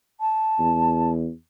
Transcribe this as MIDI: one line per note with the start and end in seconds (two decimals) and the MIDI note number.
0.20 1.11 81
0.59 1.30 40